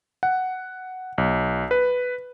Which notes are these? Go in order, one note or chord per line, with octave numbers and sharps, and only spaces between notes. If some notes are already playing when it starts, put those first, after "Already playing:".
F#5
B1
B4